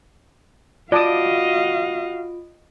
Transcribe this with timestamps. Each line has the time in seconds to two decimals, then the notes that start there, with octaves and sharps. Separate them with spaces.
0.92 F4 F#4 D5 D#5 F5 A5 D#6 D7